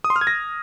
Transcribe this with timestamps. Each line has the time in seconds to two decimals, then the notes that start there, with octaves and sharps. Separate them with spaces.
0.04 D#6
0.10 C6
0.16 F6
0.21 G#6
0.27 A#6